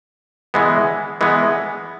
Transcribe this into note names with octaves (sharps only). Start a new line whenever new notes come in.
E3 G#3 B3
E3 G#3 B3